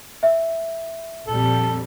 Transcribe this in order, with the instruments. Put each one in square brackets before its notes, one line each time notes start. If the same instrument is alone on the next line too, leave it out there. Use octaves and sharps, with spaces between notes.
[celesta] E5
[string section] A#1 F2 G3 [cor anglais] A4